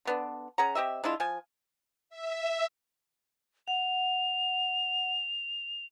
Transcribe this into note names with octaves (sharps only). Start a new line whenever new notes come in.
D3 B3 D4
C#4 G#4 F#5 A#5
C4 G4 D#5 E5
G#3 D4 E4 F4
F3 G#5
E5
F#5 F7